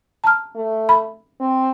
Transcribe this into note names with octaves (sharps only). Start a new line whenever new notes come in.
A5 A#5 F6
A3
B5
C4